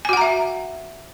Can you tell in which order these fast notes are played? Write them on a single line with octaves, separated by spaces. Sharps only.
G#5 F#4 F#5 A#5 E5